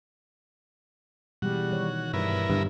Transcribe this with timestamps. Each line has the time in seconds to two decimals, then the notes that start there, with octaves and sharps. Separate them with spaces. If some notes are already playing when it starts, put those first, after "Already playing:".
1.42 B2 E3 G3 G#3 F#4
1.71 D#3 C#5
2.13 G2 B3 E4 A#4
2.50 G2 D3